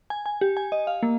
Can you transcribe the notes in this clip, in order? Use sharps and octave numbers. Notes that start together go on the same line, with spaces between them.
G#5
G#5
G4
G#5
D#5
F5
A#3